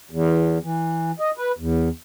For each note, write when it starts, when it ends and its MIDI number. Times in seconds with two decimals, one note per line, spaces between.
0.11 0.58 40
0.63 1.11 52
1.19 1.31 75
1.38 1.52 71
1.58 1.89 40